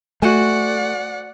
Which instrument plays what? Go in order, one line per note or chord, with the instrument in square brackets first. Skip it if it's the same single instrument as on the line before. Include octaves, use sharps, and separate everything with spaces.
[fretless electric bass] A3 [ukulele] F#4 C5 G#5 [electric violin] D5 F#5